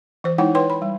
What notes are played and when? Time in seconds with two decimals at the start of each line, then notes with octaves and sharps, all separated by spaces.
0.24 E3 C5
0.38 G#3 D#4 E4 C#5 F#5 G5
0.55 B4 C#5 G5 C6
0.70 B5
0.82 G3